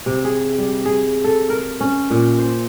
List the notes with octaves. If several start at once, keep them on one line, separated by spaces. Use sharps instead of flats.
C3
G#4
G3
G#4
A4
A#4
C#4
A#2
C5